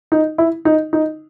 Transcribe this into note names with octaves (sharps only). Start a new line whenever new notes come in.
D#4
E4
D#4
D#4